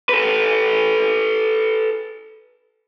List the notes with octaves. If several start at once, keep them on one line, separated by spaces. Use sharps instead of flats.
A4 B4